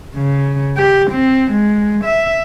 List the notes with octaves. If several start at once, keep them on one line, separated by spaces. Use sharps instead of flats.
C#3
G4
C4
G#3
E5